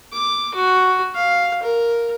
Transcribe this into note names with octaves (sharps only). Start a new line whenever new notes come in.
D6
F#4
F5
A#4